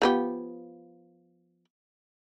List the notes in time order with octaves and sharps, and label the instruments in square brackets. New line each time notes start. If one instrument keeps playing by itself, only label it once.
[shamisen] F3 B3 G4